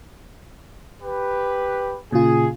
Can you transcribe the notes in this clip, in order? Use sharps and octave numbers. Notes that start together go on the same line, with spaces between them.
G4 B4
A#2 C#3 F4 G#4